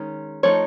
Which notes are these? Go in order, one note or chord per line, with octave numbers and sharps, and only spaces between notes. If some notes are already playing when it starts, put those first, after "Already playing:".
Already playing: D#3 G#3 C#4
F3 A3 D#4 C#5